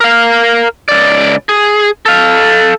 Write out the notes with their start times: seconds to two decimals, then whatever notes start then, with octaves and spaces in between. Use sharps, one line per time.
0.01 A#4 F5
0.89 C#2 D5
1.49 G#4
2.06 A4 F5